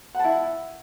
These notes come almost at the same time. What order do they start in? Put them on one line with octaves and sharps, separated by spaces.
F#5 A5 E4